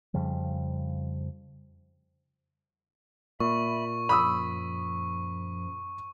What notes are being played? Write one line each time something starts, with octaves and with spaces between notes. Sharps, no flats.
F2 C#3 F3 G3
A#2 E5 B5 C#6
F#2 F3 B5 D#6 E6